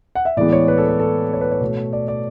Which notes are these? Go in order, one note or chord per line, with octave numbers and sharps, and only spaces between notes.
F#5
E5
A2 E3 G#3 B3 D5
C#5
B4
A4
B4
A4
C#5
B4
C#5
B2 A3
D5
D5